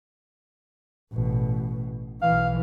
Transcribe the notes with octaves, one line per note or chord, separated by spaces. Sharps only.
A1 B2
B1 E3 F5